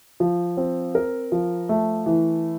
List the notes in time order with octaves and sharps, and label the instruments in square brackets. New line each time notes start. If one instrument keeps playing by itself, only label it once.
[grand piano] F3
C4
A#4
F3
A3
E3